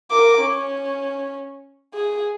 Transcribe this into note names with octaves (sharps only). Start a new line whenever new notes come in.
A#4 D6
C#4
G#4